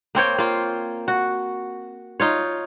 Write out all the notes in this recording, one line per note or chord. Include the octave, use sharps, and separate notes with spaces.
A#3 C4 C#5 G5
A#3 F4
F#4
D#4 F4 C#5